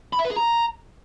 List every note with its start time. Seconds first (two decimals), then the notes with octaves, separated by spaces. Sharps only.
0.13 B5
0.19 E5
0.25 B4
0.31 G#4
0.36 A#5